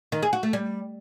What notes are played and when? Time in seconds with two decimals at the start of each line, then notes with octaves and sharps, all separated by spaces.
0.12 D#3
0.22 G#4
0.33 F#4
0.43 A3
0.53 G3